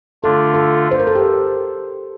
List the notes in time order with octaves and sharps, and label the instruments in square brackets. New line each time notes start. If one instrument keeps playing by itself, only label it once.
[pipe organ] D3 A3 D4 F4 [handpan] A4
[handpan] A4
C5
A#4
A4
G4